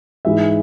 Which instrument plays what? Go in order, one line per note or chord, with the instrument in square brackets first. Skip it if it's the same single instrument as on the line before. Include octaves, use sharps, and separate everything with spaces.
[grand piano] G#2 E3 G#3 E5